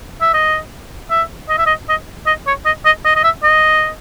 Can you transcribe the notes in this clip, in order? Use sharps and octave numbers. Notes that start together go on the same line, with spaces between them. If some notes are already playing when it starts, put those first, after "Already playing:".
E5
D#5
E5
D#5
E5
D#5
D#5
D#5
C#5
D#5
D#5
D#5
D#5
E5
D#5